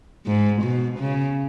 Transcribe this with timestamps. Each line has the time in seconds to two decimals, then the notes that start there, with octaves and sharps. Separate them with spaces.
0.26 G#2
0.62 B2
0.99 C#3